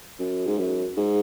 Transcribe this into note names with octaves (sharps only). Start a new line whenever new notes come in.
F#2
G#2
F#2
G#2